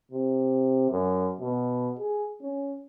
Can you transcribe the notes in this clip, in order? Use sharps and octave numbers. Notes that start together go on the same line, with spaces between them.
C3
F#2
B2
G#4
C#4